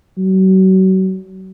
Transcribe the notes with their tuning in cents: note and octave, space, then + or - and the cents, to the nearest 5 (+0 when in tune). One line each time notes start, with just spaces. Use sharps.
F#3 +35